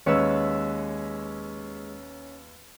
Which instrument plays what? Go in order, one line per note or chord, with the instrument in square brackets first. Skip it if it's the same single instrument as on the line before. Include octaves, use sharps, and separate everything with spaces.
[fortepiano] D#2 B4 E6 [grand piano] G#3 [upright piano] C#4 C#5 C#7